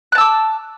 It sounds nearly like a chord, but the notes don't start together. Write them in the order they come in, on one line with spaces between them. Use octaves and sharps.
F#6 A5 E6 D6